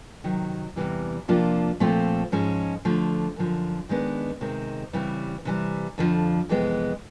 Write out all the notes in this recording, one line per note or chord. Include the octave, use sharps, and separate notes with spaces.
C3 D#3 F#3
E2 C3 E3 G3
C3 F3 A#3 D4 F4
A#2 F3 A3 C4 F4
G#2 F3 G#3 C#4
D3 F3 A3
F#2 D3 F3
D#3 G#3 B3 D4
C3 D#3 G#3 C4
C#3 E3 G3 C4 E4
C3 E3 G3
F2 D3 F3
F2 C3 E3 G#3 B3